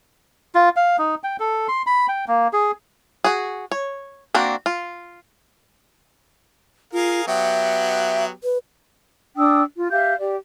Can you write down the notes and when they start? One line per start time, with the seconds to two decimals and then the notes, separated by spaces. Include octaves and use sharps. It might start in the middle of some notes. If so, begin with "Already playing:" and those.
0.55 F4
0.76 F5
0.98 D#4
1.24 G5
1.40 A4
1.68 C6
1.87 B5
2.08 G5
2.28 A#3
2.53 G#4
3.24 F#4 G#4
3.71 C#5
4.34 A#3 C4 D4 F#4
4.66 F4
6.93 F4 G#4 A#4 F5
7.27 F#3 B3 G4 E5
8.44 B4
9.37 D4 G5 D#6 E6
9.77 F4
9.91 G4 E5 F5 G6
10.19 G4 D5